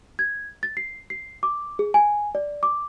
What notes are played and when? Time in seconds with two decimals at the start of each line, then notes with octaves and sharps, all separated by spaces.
0.19 G#6
0.63 A6
0.77 C7
1.10 C7
1.43 D6
1.79 G#4
1.94 G#5
2.35 D5
2.63 D6